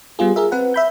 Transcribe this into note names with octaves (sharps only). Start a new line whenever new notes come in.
G3 B3 F4 G#4
G#4 A#4 E5
C4 B4 F#5
E5 B5 G6